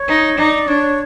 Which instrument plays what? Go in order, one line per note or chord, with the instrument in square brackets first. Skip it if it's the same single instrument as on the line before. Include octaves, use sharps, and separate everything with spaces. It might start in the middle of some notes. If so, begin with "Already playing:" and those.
Already playing: [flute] C#5
[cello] D#4
[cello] D#4 [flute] D5
[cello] D4 [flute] C#5